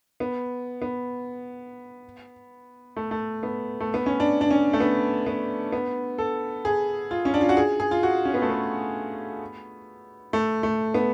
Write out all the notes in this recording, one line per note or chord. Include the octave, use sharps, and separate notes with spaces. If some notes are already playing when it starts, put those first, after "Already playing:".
B3
B3
A3
A3
B3
A3
B3
C#4
D4
D4
C#4
A3
B3
B3
B3
A4
G#4
F4
C#4
D4
F4
F#4
G#4
G#4
F4
F#4
C#4
B3
A3
B3
A3
A3
B3